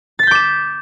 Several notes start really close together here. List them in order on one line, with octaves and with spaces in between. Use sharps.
A6 B6 G6 D6 E7